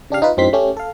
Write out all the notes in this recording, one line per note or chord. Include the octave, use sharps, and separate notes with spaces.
C#3 D4 G4 F5
D#4 F4 B4
F#2 A2 C4 D#4 C6 B6
A3 C#4 G4
A4 F5